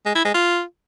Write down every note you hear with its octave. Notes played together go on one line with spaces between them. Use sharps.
G#3
E4
G#3
F4